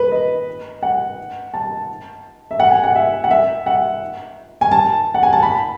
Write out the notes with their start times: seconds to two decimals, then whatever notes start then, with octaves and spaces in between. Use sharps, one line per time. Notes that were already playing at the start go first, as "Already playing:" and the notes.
Already playing: B4
0.12 D#5
0.83 F#5
1.54 A5
2.51 E5
2.60 F#5
2.71 G#5
2.84 F#5
2.96 E5
3.24 F#5
3.31 E5
3.66 F#5
4.61 G#5
4.71 A5
5.14 F#5
5.23 G#5
5.33 A5
5.43 B5